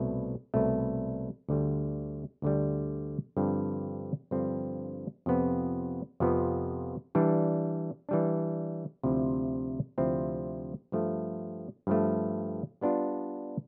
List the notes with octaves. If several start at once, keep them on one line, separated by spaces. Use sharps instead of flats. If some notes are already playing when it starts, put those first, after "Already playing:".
Already playing: C2 B2 A3
C2 B2 A3
D2 D3 G3
D2 D3 G3
G2 D3 F3 C4
G2 D3 F3 C4
F2 C3 F3 B3
F2 C3 F3 B3
E3 G3 D4
E3 G3 D4
D2 C3 F3 C4 E4
D2 C3 F3 C4 E4
G2 F3 A3
G2 F3 A3
G3 B3 D4 F4